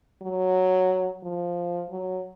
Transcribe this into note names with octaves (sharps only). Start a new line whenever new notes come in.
F#3
F3
F#3